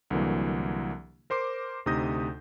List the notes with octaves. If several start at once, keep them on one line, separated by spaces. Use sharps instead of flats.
C2 D3 E3 F#3 A#3
A#4 C5 C6 D6 C7
D2 C3 D#4 D#6 G6 A#6